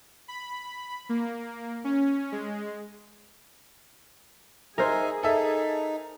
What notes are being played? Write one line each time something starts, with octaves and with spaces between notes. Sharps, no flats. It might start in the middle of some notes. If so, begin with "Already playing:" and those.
B5
A#3
C#4
G#3
D#4 G#4 A#4 C5 E5 G#5
D#4 A4 E5